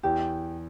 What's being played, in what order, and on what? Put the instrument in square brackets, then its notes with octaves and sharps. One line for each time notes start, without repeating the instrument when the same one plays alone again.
[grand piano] E2 [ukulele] G4